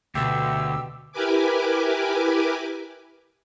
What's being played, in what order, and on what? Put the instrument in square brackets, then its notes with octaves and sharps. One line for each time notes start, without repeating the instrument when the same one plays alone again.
[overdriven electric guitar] D2 [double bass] B2 [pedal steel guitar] G4 [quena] E6
[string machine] E4 G4 A#4 B4 G#5 D6